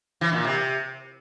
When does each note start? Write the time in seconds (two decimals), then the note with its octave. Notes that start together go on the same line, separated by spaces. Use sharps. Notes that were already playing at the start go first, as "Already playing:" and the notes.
0.21 E3
0.33 A#2
0.44 C3